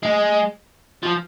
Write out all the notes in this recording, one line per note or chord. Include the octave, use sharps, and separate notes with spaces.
G#3
F3